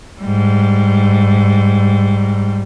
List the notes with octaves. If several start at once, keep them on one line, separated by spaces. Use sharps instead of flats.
G#2 G3